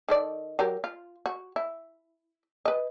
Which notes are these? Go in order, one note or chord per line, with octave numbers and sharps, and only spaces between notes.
D#3 A4 D5
F#3 G4 A#4
F4
F#4
E4
B4 D#5